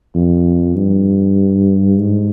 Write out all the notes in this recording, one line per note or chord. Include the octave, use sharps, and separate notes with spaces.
F2
G2
G#2